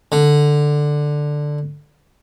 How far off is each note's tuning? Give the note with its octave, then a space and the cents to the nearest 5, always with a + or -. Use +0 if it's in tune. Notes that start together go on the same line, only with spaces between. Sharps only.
D3 +5